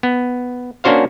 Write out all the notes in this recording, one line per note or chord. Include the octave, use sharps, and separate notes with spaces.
B3
A#3 C#4 D4 F#4 C5 F5